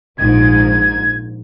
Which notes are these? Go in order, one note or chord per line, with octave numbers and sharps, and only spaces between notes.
A#1 G#2 G#6